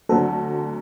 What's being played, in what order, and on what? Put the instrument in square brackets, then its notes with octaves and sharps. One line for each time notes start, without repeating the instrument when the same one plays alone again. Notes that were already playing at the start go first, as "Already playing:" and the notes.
[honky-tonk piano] D2 D3 F#3 C4 [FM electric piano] A4